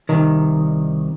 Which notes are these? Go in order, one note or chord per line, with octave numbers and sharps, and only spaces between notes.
C2 D#3